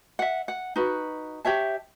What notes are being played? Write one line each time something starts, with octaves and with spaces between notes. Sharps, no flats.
E5 F#5
F#5
D#4 F#4 B4
G4 C#5 E5 A5